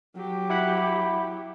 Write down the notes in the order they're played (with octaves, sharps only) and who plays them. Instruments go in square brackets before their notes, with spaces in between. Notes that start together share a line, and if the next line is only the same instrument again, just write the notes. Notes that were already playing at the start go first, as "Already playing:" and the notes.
[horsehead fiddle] F#3 G4
[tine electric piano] E4 F#5 B5